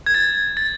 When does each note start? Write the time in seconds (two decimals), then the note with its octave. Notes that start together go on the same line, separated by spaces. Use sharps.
0.06 G#6
0.14 A6
0.57 A6